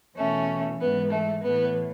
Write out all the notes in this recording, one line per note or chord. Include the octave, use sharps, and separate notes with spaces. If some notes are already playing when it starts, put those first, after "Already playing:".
E2 B2 A3 C#4
G#2 E3 B3
A3
A2 E3 B3